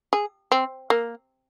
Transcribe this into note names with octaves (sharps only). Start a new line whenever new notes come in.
G#4
C4
A#3